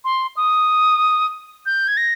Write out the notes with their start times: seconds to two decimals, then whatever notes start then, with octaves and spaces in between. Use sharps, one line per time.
0.05 C6
0.37 D#6
1.66 G6
1.88 G#6
1.97 A#6